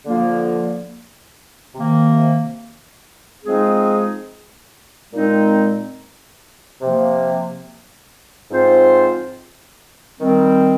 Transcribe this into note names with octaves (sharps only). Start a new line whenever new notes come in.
D3 F3 A#3 F4
C3 D#3 A#3
F3 G#3 C4 D#4 G#4
A#2 G#3 C4 D#4
C3 F3 A#3
G#2 F3 C4 F4 C5
D#3 G3 C4